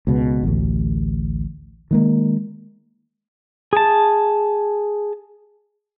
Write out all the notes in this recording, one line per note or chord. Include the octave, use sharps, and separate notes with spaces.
C#2 B2
A1 D2
D#3 G#3 A#3
G#4 A5